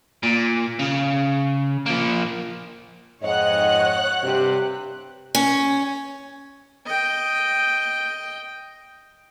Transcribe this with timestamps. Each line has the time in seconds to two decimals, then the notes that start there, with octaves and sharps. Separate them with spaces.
0.23 A#2
0.79 C#3
1.86 F3 A#3
3.23 F2 G#2 C#5 D#5 F#5 F#6
4.24 G2 C3 G4
5.35 C#4
6.86 D#5 G5